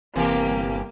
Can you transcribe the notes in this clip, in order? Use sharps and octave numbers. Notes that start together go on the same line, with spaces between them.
G1 C3 E3 A#3 G4